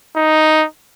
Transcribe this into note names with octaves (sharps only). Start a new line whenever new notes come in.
D#4